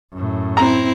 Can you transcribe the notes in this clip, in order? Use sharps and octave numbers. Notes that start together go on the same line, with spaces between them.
F#2 A2
C4 E4 A#5